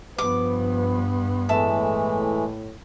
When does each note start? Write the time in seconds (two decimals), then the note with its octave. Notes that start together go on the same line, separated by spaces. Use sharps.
0.18 G2 F3 B3 B4 D6
1.49 A2 E3 G#3 A3 E5 A5